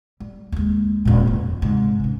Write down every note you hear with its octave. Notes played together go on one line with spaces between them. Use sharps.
G3
D#2 G#3
D#1 A#2
F2
G#2 C3
E3 C#4